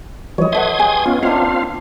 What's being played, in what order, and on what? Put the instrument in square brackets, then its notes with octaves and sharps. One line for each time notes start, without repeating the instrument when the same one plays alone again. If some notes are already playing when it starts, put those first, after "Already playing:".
[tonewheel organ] E3 F3 G3 [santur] C#5 D#5
[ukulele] A4 E5 [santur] B4 D#5 F#5 [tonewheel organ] C6 D#6 G#6
[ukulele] G4 G#4 G#5
[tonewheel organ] B3 C#4 F4 [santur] F5
[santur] A#3 D4 [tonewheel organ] C4 F4 F5 [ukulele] E4